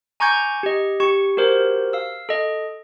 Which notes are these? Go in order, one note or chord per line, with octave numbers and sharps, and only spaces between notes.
G#5 A#5 C#6 D6 G6 G#6
G4 D#5
G4 C#6
F#4 G4 A#4 C5
F5 E6
A4 D#5